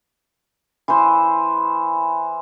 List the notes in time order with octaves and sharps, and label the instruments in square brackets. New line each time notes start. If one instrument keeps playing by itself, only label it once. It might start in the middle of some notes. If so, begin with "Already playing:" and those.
[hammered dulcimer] E3 C5